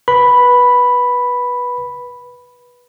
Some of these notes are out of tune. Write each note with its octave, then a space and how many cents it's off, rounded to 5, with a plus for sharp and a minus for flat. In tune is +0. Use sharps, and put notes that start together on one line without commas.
B4 -15 B5 +0